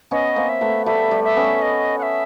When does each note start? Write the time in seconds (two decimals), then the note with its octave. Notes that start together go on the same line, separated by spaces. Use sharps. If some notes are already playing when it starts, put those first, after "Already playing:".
0.11 B3 C#4 D#5
0.36 A#3 C4
0.49 E5
0.61 A3 B3
0.86 G3 A3 E5
1.11 G3
1.24 E5
1.36 B3 C#4
1.62 D#5
1.98 F#5
2.03 E5